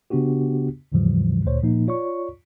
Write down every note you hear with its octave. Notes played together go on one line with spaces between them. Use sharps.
C#3 B3 D4 F#4 G4
D#2 G#2 C#3 E3 F3 G3
D2 A#2 C5 C#5
A#2 F3 A#3 D#4
F4 C#5 D5 C#6